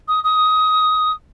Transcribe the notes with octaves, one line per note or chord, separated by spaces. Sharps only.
D#6
D#6